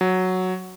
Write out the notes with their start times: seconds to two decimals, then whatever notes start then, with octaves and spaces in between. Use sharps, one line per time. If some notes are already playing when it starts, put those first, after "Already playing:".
0.01 F#3